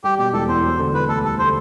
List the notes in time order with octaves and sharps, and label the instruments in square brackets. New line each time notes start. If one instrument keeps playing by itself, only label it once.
[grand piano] G3 [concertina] G4
[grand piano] B2 [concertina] G4
[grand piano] E1 [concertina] A4
[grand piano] E2 [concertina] C5
[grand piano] F#3
D3
[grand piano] E1 [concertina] B4
[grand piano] D2 [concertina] A4
[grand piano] G3 [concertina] A4
[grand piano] D3 [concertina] C5